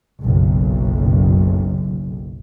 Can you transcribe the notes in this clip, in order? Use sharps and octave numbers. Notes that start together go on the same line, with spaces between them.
F#1 B1